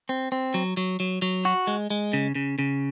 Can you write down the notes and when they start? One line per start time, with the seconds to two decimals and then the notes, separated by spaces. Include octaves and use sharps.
0.09 C4
0.32 C4
0.54 F#3
0.77 F#3
1.00 F#3
1.22 F#3
1.45 F#4
1.67 G#3
1.90 G#3
2.13 C#3
2.35 C#3
2.59 C#3